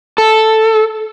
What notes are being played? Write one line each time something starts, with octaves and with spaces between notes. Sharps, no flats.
A4